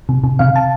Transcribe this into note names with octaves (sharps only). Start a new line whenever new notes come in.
C3
C3
C3 F5
A5